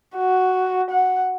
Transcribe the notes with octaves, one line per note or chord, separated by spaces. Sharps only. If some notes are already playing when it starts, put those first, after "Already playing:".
F#4
F#5